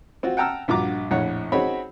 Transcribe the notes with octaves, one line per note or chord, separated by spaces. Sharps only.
C4 F4 F#4
F#5 G5 A5 A#5 E6 F6
A#1 G2 F4 F#4 A#5 D6
A#1 F2 A2 C#5 F#5
C4 D#4 F#4 G#4 C#5 B5